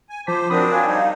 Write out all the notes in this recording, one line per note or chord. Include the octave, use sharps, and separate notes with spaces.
G#5
F3 C5 A5 D6 B6
F#3 C4 D4 F#4 A#4 C5 B5 D#6
F5 G#5 G#6
G3 D#4 F5